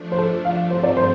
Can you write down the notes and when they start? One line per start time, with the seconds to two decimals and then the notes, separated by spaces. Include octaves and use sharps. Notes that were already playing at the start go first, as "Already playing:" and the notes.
Already playing: F3 A3 D4
0.12 C5
0.18 A4
0.45 F5
0.58 G2 F3 A3 C4
0.71 C5
0.83 D5
0.97 C5